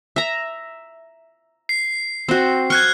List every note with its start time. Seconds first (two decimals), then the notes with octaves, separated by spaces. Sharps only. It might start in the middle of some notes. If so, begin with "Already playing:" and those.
0.16 E5 A#5
1.69 C7
2.28 C4 F#4
2.70 C#6 F6 F#6 G#6